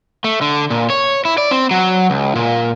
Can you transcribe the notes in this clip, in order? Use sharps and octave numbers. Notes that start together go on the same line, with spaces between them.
A3
D3
A#2
C#5
E4
D5
C4
F#3
C#2
A#2